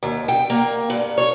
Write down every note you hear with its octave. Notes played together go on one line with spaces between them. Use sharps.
D#2
G5
A#3
G2
C#5